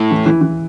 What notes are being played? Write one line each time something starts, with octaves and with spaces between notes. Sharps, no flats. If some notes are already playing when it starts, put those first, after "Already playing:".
Already playing: A2
E3
E3
E3